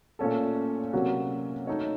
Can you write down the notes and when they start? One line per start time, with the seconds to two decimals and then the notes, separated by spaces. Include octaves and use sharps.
0.19 A#2 A3 C#4 A4
0.93 C3 F#3 A#3 C#4 F#4
1.67 A3 D#4 A4 C#5